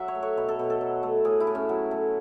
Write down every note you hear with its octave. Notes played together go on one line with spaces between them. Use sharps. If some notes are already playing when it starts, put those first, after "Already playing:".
Already playing: F#3 E5 F#5
C#5
A3
C#5
B2 C#5
A4
B2
A4
F#3
A3
A2 G#4
E4
A2
C#4
F#3
A3